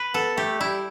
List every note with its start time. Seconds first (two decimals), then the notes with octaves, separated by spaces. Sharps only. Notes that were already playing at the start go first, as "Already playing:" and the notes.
Already playing: B4
0.14 B3 A4
0.37 A3 G4
0.60 G3 E4